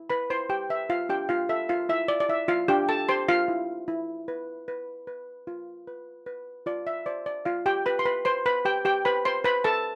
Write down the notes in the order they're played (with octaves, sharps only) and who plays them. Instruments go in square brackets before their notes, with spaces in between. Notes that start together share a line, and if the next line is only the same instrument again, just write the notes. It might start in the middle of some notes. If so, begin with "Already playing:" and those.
Already playing: [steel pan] E4
B4 B5
E4 C5 C6
G4 G5
B4 E5
F4 F5
D4 G4 G5
F4 F5
A4 E5
F4 F5
E4 E5
D5
D5
E4 E5
F4 F5
D4 G4 G5
A4 A5
G4 C5 C6
F4 F5
E4
E4
B4
B4
B4
F4
B4
B4
F4 D5
E5
C5 D5
D5
F4 F5
G4 G5
B4 B5
C6
B4 B5
B4 C5 C6
B4 B5
G4 B4 G5
G4 G5
B4 C5 B5
C5 C6
B4 C5 B5
A4 A5